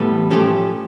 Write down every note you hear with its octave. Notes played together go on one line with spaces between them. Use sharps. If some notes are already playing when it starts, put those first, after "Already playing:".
Already playing: A2 E3 G3 B3 A4 B4
A2 F3 A3 C#4 G4 A4